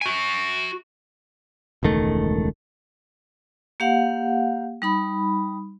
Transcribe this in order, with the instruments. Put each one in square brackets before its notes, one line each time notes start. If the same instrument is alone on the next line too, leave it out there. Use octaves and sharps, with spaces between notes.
[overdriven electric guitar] F#4 G#5
[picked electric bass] E1 C#2 D#3 A3
[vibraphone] A#3 G4 F5 F#5
G3 D#4 B5